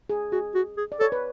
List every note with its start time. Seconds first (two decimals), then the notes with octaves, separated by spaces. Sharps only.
0.10 G#4
0.32 F#4 G#4
0.55 F#4
0.77 G#4
0.92 D5
1.00 A4 C#5
1.12 B4